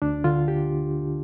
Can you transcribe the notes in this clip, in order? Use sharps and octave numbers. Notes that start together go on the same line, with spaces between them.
D2 D4
D3 F4
G4